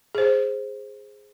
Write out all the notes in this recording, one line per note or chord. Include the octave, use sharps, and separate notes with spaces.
G#4 C5